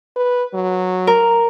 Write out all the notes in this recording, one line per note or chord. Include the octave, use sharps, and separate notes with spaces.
B4
F#3
A#4